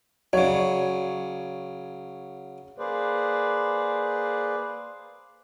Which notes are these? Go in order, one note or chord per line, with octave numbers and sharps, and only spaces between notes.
C#3 F#3 C#5 D5
A#3 G#4 B4 C5 D5